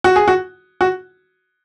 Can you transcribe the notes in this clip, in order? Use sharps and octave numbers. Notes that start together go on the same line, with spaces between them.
F#4
G#4
F#4
F#4